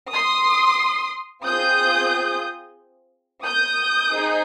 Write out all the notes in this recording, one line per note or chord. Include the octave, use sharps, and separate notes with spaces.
C6 D#6
C4 F4 G#4 D#6 G6
D#6 G6
C4 D#4 G#4